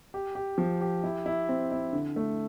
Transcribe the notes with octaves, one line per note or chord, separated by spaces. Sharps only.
G4
G4
F3
G4
E4
E4
C4
E4
D3
A3